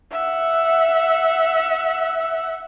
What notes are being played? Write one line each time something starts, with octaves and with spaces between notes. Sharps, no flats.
E5 F#5